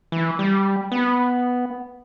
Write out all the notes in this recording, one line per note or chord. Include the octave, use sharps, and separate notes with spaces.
E3
G3
B3